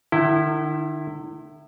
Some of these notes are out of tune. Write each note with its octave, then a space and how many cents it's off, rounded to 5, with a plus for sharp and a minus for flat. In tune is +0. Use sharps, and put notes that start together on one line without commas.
D#3 -45 E4 +0 G5 -30